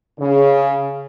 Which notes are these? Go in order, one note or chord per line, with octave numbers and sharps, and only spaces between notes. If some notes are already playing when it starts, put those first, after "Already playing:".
C#3